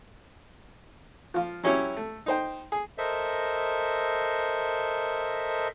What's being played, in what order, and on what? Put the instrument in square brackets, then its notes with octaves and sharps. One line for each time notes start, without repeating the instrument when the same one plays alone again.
[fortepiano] F3 F4
F#3 C#4 E4 G4 C#5
A3
D#4 C5 G5
G#4
[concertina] A4 A#4 C5 D#5 E5